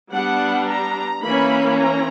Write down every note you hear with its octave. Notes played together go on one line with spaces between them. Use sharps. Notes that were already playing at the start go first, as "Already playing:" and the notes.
G3 B3 D4 F#5
A#5
E3 A#3 C#4 B5
A#5